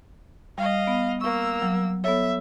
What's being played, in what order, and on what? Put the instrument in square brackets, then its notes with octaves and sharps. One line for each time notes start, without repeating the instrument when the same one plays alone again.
[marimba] G3 [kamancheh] D#5 F5
[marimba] B3
[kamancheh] A#3 E6 [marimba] C#6
[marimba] F#3
[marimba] B3 A4 C#5 [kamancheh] E5